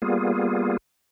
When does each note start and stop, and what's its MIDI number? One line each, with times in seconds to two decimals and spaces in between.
0.02 0.77 55
0.02 0.77 58
0.02 0.77 59
0.02 0.77 65
0.02 0.77 68